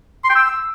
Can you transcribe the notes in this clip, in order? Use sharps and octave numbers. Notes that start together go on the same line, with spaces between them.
C6
G5
E6